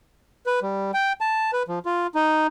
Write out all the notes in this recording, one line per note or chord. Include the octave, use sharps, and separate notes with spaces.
B4
G3
G5
A5
B4
F3
F4
D#4